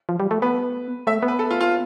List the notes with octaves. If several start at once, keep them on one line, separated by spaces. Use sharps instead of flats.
F3
G3
A3
B3 B4
A3 E5
B3
B4
A4
F4
F4